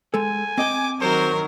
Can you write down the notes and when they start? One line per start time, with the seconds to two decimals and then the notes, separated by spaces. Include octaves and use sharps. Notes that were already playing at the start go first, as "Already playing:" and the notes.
0.14 G#3 A4 G#5
0.58 C4 D#5 G5 D6
1.00 D#3 F#3 A#4 C5